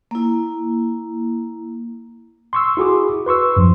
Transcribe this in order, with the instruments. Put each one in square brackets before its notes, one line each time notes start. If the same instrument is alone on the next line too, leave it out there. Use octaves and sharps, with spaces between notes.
[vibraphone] A#3 E4
[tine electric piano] C6 C#6 E6
E4 F#4 G#4 D6
B4 C6 C#6 E6
F#2 F3